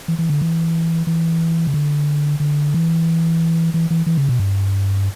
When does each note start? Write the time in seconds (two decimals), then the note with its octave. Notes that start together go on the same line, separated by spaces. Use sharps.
0.08 E3
0.19 E3
0.30 D3
0.42 E3
1.07 E3
1.67 C#3
1.74 D3
2.40 D3
2.74 E3
3.74 E3
3.90 E3
4.07 E3
4.17 C#3
4.29 B2
4.39 G2